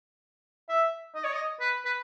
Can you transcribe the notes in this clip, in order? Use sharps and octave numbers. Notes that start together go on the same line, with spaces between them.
E5
D#5
C#5
D#5
B4
B4